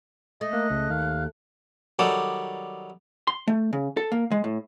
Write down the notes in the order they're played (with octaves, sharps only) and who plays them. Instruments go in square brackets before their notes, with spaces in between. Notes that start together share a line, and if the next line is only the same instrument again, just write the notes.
[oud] A3 [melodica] D#5
[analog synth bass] A#3 [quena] F#6
[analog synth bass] C#2
[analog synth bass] D#2 [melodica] F5
[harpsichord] D#3 F#3 G3 A4 D5
[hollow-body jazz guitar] C6
A3
C#3
A4
A#3
G#3
A2